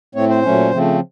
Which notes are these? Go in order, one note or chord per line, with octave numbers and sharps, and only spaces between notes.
A2 A3 C4 C#5
C5
A#2 F#3 A3 C#4
C#3 F3 A3 C4